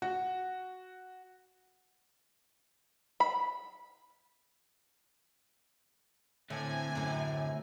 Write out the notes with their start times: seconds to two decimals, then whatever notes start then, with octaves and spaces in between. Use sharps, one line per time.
0.02 F#4
3.20 B5
6.50 A2 D3 C4 G#5
6.95 F#2 A2